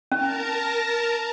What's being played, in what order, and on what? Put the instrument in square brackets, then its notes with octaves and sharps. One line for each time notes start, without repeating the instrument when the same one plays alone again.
[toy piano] C#4 [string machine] A#4 A5 A#5